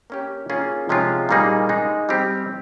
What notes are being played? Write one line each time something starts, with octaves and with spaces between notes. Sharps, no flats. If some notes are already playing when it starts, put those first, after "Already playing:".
A#3 C#4 G4
A#3 C#4 F4 G#4
C3 F3 G#3 C#4 F4
A#2 G3 A#3 D#4 G#4
G#3 D#4 G#4
G3 C4 G4